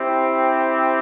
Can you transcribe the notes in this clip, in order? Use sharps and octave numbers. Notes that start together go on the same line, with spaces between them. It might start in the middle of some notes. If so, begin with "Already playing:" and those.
Already playing: C4 E4 G4